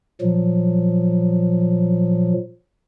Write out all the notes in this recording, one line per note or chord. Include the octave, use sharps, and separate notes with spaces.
A#2 F3 F#3